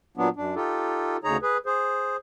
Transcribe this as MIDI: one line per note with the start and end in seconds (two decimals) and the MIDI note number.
0.17 0.29 46
0.17 0.29 54
0.17 0.29 59
0.17 0.29 62
0.36 0.55 42
0.36 0.55 62
0.55 1.17 63
0.55 1.17 65
0.55 1.17 67
0.55 1.17 69
1.24 1.37 38
1.24 1.37 49
1.24 1.37 63
1.24 1.37 68
1.24 1.37 73
1.24 1.37 82
1.42 1.57 68
1.42 1.57 71
1.66 2.17 68
1.66 2.17 72